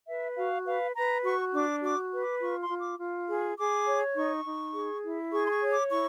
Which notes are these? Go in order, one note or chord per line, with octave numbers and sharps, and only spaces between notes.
B4 E5
F#4 F5
B4 F5
B4 A#5
F#4 C#6
D4 D6
F#4 D6
B4
D6
F4 C#6
C6
F4
D6
F4
G#4
G#4 D6
C#5
D#4 C#6
D#4
G#4
E4
G#4 C#6
C6
C#6
C#5
D6
E4 C#6